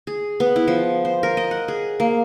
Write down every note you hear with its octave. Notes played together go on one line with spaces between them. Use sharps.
G#4
B3
E4
F3
C5
A#4
D#5
F#5
G#4
A#3